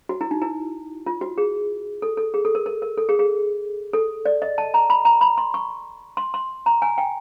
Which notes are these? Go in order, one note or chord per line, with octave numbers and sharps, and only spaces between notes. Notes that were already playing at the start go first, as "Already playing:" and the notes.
F#4
E4
D#4
E4
F4
F#4
G#4
A4
A4
G#4
A4
A#4
A#4
A#4
A4
G#4
G#4
A4
D5
D#5
A5
A#5
B5
A#5
B5
C6
C#6
C6
C6
A#5
G#5
G5